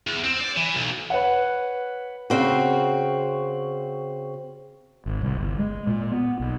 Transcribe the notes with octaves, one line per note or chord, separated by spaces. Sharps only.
E2
C4
D5
E3
B1
B4 C#5 F#5
C#3 C4 F#4
G#1
C2
G1
G#3
A#2
B3
B1